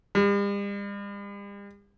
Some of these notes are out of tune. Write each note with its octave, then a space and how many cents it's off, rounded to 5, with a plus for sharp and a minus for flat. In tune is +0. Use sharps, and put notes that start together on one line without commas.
G3 +45